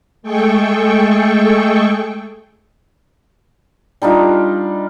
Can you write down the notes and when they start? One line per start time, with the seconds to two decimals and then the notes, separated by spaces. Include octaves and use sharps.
0.22 G#3 A3 G#4 A4 G5 C#6
4.02 G3 D4 D#4 F4